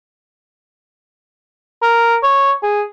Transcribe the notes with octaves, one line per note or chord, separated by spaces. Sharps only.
A#4
C#5
G#4